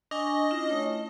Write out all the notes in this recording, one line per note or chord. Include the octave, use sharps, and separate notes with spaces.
D4 D#5 G#5 C#6
C#4 E4 F4
A3 C#5